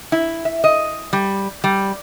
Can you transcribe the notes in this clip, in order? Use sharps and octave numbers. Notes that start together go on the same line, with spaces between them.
E4
E5
D#5
G3
G3